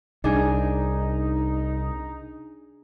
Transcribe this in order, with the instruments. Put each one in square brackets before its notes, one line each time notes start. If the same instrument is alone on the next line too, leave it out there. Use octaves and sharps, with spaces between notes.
[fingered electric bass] C2 [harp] D4 G#4 [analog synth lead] D#4